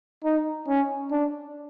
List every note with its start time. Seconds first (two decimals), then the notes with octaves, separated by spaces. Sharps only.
0.24 D#4
0.68 C#4
1.11 D4